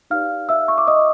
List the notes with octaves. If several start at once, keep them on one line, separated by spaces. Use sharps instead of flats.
D#4 G4 B4 D5 F5 F6
E5 E6
C#6
D6
D#5 D#6